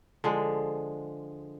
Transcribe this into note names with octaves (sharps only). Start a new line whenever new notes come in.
D3 F3 G#3